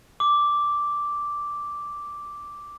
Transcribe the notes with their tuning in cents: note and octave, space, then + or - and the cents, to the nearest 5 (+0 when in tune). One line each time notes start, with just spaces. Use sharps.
D6 -5